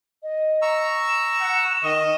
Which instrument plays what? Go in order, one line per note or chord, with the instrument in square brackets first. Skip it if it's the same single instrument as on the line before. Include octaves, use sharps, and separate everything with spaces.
[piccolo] D#5
[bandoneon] A#5 C#6 E6
[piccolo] E7
[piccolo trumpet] F#5
[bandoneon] D#3 C#6 [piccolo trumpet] D#5